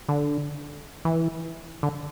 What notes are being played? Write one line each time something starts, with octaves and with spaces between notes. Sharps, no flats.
D3
E3
D3